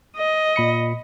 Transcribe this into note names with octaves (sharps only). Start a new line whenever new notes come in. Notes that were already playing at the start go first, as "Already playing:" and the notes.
D#5
A#2 B5 C#7